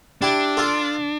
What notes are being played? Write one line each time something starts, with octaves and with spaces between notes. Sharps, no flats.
D4 E4 G4
F4 A4